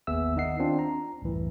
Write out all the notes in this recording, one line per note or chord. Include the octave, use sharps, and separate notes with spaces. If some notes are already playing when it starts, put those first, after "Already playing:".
G1 D#2 B3 G#4 E5 E6
D#3 D#4 D#5 F#5 C7
C4 D4 F4
A#5
C2 F#2 A2 E3